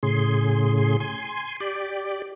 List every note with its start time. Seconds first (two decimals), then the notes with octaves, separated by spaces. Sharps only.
0.03 A2 C#3 G#4 C6
1.00 G#5 C6
1.60 G4 D5